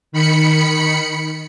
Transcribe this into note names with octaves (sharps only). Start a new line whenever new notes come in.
D#3 B5 C#7